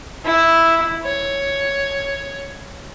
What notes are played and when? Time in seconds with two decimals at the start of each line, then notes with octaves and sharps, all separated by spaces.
0.25 E4
1.04 C#5